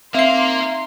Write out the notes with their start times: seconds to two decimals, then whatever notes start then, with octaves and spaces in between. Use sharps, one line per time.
0.14 A#3 C4 D#4 E5 F5 C6 C7